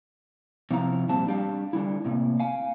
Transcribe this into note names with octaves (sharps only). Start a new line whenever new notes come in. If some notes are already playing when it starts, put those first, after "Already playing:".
C3 F3 C4 E4 F5 A#5
F2 A#2 G3 C4 A5
G3 D4 G4 F5
D3 G3 E4
A2 C3 G#3 A#3
F5 G#5